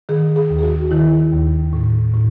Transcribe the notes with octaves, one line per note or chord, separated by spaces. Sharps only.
D#3 G#4
G#4
D#2
G#4
F#4
D#3 E4
D#2
A2
A2